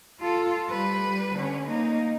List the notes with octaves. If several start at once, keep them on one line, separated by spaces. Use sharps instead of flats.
F4 A4
G3 B4
D3 C#4
A#3 D#4